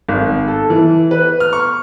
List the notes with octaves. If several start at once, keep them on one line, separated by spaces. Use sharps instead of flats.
G#1
A4
E3
B4
F6
C#6